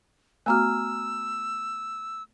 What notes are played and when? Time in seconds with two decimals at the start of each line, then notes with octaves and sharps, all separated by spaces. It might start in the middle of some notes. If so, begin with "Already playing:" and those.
0.46 A3 B3 F#4 G#5 A#5 E6 F6